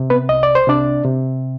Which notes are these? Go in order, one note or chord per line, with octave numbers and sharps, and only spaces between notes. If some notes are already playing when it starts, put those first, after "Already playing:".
Already playing: C3
B3 B4
C2 D#5
D5
C5
C3 D4 D5
C3